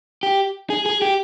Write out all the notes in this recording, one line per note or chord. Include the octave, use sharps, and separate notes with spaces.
G4
G#4
G#4
G4